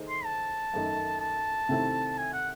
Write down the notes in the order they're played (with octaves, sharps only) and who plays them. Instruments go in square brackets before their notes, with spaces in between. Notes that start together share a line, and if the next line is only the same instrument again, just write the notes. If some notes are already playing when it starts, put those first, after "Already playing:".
Already playing: [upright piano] D#3 A3 D#4 G#4 C5
[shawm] C6
A5
[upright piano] F#2 D#3 A3 D#4
[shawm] A5
[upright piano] C3 D#3 A3 C4 E4
[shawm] G#5
F#5